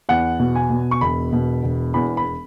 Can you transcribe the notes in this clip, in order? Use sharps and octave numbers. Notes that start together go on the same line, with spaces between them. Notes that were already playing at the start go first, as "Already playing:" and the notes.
E2 F#5
B2
G#5
B2
C#6
E1 B5
B2
E1
E2 B5
B5